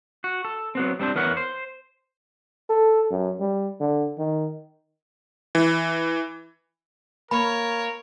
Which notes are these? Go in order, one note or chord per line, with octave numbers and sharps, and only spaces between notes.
F#4
A4
F#3 B3 C4
G3 C4 D4 C5
E2 B3 A#4 C#5 F#5
C5
A4
F#2
G3
D3
D#3
E3
A#3 A#4 C#5 B5